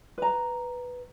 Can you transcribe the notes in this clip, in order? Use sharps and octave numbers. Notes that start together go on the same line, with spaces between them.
B4 A#5